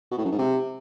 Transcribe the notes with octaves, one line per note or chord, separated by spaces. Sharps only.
B2
A2
F#2
G#2
C3